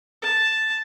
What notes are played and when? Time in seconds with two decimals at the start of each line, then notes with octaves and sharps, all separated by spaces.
0.22 A5